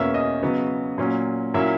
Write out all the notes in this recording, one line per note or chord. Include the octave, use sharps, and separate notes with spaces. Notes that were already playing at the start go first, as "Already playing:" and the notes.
Already playing: E2 B2 A#3 C#4 E5 E6
D#5 D#6
C#3 F#3 B3
A#2 F#3 C#4
A#2 F#3 A#3 C#4 E4 E5